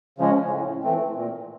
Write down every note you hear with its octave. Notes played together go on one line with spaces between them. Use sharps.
C#3 F3 G#3 C#4
A2
E3 A3 C4
A#2